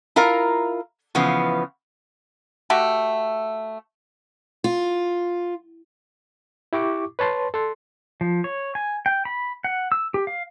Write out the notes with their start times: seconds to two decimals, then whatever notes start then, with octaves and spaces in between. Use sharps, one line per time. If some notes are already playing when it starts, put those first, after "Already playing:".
0.16 E4 F4 A#4 F5 A#5
1.15 C#3 E3 F3 B3
2.70 A3 F#4 G4
4.64 F4
6.73 E4 G4 C#6 D6
7.19 B4 C#5 A5 C6
7.54 A4 C6
8.21 F3
8.44 C#5
8.75 G#5
9.06 G5
9.25 B5
9.64 F#5
9.92 E6
10.14 G4
10.27 F5